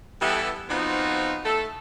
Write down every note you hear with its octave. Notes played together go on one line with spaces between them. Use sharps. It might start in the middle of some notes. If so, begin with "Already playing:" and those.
E3 G3 B3 E4 A4
F3 B3 C4 D#4 F4 F#4
A3 A4